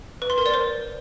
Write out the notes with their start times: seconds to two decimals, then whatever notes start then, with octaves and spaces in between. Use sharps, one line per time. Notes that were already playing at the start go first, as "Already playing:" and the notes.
0.22 B4
0.30 C6
0.38 A#4
0.46 D5
0.54 C5